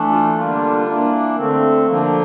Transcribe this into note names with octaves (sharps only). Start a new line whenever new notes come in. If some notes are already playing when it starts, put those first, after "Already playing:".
Already playing: E3 A3 D4
F4
D3 G3 A#3 D4 F4
E3 A#3 D4
D3 A3 C4
D3 F3 A#3